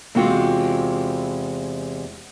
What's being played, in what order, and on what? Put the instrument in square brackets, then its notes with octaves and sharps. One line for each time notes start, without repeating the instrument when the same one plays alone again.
[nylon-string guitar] E2 C3 G#3 C4 F4 F#4